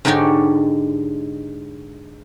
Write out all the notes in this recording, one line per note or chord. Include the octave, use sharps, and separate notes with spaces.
G#2 D3 D#4 G4 C#5 D5